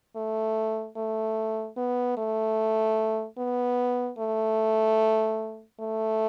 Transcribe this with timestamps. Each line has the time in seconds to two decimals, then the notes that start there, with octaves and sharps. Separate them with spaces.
0.16 A3
0.96 A3
1.77 B3
2.17 A3
3.38 B3
4.19 A3
5.80 A3